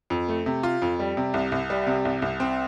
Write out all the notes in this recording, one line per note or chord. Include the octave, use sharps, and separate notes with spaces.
F2
A3
C3
F4
F2
G3
C3
C2
C2
G3
C3
C2
C2
C4